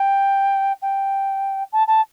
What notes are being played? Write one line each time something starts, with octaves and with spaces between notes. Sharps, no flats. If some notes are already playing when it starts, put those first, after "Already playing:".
Already playing: G5
G5
A5
A5